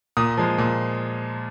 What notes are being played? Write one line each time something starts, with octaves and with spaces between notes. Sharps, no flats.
A#2 D#6
F3 G#3
A#2